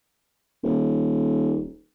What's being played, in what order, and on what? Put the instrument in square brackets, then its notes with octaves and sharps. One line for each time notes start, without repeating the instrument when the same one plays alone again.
[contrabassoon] D#1